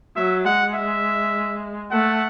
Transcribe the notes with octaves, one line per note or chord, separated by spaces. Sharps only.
F#3 E5
G#3 F#5
E5
A3 F#5